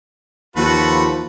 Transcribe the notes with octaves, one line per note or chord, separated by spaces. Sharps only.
D#2 F3 A3 F#4 B4